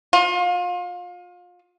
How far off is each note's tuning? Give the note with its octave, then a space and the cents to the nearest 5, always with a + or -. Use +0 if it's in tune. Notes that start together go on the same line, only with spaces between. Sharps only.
F4 +30